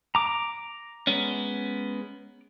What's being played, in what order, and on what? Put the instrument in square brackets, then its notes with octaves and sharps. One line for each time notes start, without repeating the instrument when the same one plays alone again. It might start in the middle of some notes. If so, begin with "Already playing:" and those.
[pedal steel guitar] A#5 D6
[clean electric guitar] G#3 B3 C#4